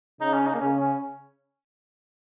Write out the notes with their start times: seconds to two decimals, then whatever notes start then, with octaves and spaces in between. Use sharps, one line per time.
0.21 C#3 D#4
0.34 C#4
0.47 D#4
0.54 A#3
0.60 C#3 C#4
0.80 C#4